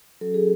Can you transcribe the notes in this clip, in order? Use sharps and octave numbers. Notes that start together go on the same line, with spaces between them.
F#3 C#4 F#4 A4
G#4